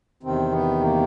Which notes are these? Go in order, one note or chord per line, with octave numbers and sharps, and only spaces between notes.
E2 C3 D#3 C4
B3
A#3